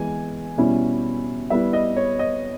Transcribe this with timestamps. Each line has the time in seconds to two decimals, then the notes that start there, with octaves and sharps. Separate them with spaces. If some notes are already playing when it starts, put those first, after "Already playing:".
Already playing: E3 G#3 B3 G#5
0.58 B2 G3 C#4 E4
1.50 G3 B3 E4 E5
1.73 D#5
1.97 C#5
2.19 D#5